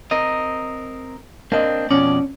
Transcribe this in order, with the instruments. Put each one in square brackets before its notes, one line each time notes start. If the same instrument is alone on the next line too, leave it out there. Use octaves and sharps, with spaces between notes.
[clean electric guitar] C4 A#4 D#5
[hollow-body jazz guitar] A#3 D#5 [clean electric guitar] C4 D4
[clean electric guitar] F2 B2 D5 [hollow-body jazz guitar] C#4